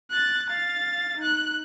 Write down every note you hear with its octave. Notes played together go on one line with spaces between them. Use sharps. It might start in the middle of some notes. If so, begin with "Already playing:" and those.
F#6 A6
F5 A6
D#4 F#6